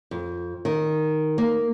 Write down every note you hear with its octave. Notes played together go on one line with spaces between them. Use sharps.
F2
D#3
A#3